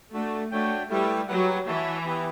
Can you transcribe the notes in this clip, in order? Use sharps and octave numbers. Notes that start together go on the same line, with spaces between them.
A3 D4 F#4 A4
A3 D4 F#4 C#5 G5
G3 A3 E4 G4 B4 E5
F#3 G4 B4 F#5
E3 F#4 C#5 E5 A5
B3 E4 G4 B4